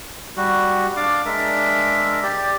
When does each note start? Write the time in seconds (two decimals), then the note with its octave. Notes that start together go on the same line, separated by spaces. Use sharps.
0.37 G3 F#4
0.96 D4 D5 F5 D6
1.26 G#3 D4 A#4 E5
2.23 G4 D5